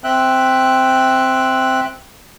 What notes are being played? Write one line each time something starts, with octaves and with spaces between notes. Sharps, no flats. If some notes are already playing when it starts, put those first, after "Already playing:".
C4 E5 G5 F#6